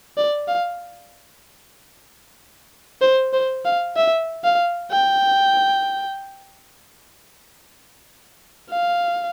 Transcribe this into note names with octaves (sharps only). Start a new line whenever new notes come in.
D5
F5
C5
C5
F5
E5
F5
G5
F5